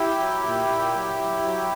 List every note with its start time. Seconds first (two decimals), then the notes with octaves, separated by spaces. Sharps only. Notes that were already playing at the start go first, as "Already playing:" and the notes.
Already playing: E4 G4
0.19 F#3
0.43 A#2
0.68 A#2
0.93 F#3
1.18 F#3
1.43 F#3